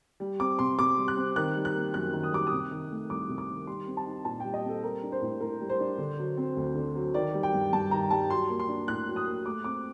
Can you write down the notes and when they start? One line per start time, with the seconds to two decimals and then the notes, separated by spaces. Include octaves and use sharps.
0.20 G3
0.40 C4 D6
0.59 C3 C6
0.78 C3 D6
0.98 G3
1.08 F#6
1.17 C4
1.36 D#3 F#6
1.56 G3
1.65 F#6
1.75 A#3
1.94 F#2 F#6
2.13 D#3
2.23 D#6
2.32 G3 D6
2.47 D#6
2.52 C3
2.71 D#3
2.90 A3
3.10 C2 D6
3.29 C3
3.38 D6
3.49 D#3
3.67 G3 C6
3.87 C4
3.97 A5
4.06 D#4
4.25 A#2 A5
4.40 G3 G5
4.54 D#5
4.65 C4 A4
4.83 G3 A#4
5.03 D4
5.12 C5
5.22 A2
5.41 A2 A#4
5.61 G3
5.70 C5
5.80 D4
5.98 D3
6.19 F#3
6.37 C4
6.57 D2
6.75 D3
6.95 F#3
7.14 D#3 D5
7.34 G3
7.43 G5
7.54 G2
7.73 G2 A5
7.91 D#3 A#5
8.11 G3 A5
8.30 F#3 C6
8.49 A#3
8.60 C6
8.69 D4
8.87 A2 F#6
9.08 F#3
9.16 D#6
9.26 A#3
9.46 A3 D6
9.64 C4 D6